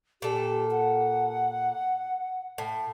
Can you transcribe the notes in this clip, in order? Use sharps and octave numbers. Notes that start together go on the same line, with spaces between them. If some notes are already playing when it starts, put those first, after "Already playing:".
A#2 G4 A4
F#5
A2